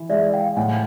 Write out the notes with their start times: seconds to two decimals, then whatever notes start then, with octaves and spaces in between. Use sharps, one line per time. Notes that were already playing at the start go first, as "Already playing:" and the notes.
Already playing: E3
0.09 G#3 D5 E5
0.33 F5 G5
0.56 A2 F#5 G#5